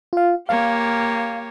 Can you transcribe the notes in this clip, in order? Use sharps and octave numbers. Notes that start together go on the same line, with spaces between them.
F4 F5
A#3 G4 C#5 F5